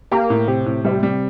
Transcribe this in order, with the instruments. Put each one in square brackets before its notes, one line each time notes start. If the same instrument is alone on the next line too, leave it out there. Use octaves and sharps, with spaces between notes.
[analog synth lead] A#3 [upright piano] G4
[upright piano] A2
[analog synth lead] C3 [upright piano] G4
[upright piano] A2
[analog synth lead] C3 [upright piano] G3
[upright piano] G3